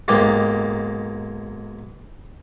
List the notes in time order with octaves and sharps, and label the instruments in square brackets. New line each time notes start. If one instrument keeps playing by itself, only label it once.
[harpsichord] B1 G#2 A#3 G4 G5